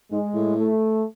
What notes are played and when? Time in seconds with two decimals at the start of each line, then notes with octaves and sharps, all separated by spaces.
0.11 G#2 G#3
0.34 A2
0.56 A3